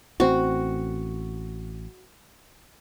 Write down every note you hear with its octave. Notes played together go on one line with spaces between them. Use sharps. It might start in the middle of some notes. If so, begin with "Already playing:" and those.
A1 C4 F#4